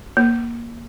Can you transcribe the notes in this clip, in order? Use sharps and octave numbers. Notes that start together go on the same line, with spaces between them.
A#3